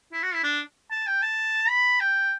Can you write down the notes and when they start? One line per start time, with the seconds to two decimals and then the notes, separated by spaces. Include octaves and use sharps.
0.13 E4
0.23 F#4
0.34 E4
0.44 D4
0.91 A5
1.07 G5
1.22 A5
1.69 B5
2.00 G5